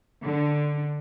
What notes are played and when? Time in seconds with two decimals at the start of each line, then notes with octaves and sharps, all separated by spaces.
0.25 D3